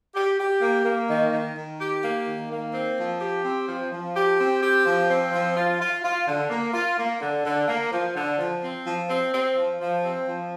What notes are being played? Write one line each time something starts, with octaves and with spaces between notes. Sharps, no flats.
G4
G4
A#3
A#3
D#3
D#3
D#3
G4
A#3
D#3
A#3
C4
F3
G4
C4
F3
F3
G4
C4
G4
F3
C4
F3
F4
F4
F4
D3
A#3
F4
A#3
D3
D3
A#3
F3
D3
F3
C4
F3
C4
C4
F3
F3
C4
F3